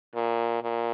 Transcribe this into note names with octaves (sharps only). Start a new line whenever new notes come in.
A#2
A#2